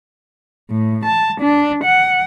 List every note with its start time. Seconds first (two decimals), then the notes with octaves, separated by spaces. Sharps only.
0.70 A2
1.05 A5
1.41 D4
1.83 F#5